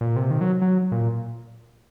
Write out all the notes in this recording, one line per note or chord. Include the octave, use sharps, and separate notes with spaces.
A#2
C3
D#3
F#3
F#3
A#2